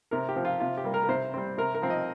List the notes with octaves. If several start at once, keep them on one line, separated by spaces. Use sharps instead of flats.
C3 A#4
G4
F3 C4
F4
C3 F4
G4
G3 A#3
A#4
A#4
C3 C5
G3 C4
C3 A#4
A#4
F3 C4
D#5